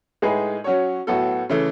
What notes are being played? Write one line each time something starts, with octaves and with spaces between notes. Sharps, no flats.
A2 G#3 D#4 G#4 B4
F#3 C#4 F#4 C#5
A2 F#3 B3 F#4 A4
C#3 E3 A3